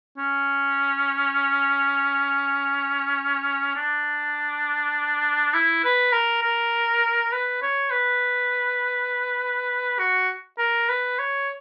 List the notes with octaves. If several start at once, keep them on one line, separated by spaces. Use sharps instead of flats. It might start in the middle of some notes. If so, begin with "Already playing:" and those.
C#4
D4
E4
B4
A#4
A#4
B4
C#5
B4
F#4
A#4
B4
C#5